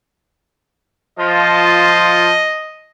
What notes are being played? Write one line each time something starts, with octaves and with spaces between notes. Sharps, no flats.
F3 F4 D#5 A5